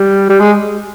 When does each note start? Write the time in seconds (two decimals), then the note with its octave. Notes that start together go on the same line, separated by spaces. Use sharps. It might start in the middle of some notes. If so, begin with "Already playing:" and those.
Already playing: G3
0.29 G3
0.40 G#3